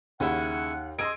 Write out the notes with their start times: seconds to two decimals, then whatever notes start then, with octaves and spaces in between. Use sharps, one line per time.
0.20 D#2 C#3 E4 F#5
0.99 G#4 D#5 C6 E6 D7